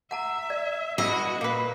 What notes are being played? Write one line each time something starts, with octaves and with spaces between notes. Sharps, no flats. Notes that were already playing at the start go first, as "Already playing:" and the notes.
E5 F#5 A5 A#5
D5
B2 E4 F#4 D#5
A#2 A#3 B4